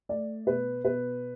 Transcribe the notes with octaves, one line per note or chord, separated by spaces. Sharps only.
A3 D5
B2 B4
B2 B4